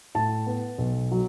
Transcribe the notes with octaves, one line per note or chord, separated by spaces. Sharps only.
A2 A5
B3
B1
F#3